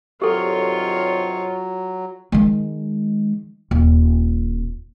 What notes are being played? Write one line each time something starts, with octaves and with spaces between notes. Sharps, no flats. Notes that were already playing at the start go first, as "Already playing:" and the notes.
G2 C3 D#3 F#3 F4 G4 A4 C#5
D#3 G#3
D#1